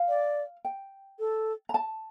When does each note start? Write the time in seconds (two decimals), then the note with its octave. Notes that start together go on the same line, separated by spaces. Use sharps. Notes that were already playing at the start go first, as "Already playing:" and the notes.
Already playing: F5
0.09 D5
0.65 G5
1.19 A4
1.69 A#5
1.74 A5